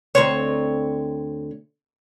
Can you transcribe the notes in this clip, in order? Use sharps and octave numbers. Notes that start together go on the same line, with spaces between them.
D2 C4 C#5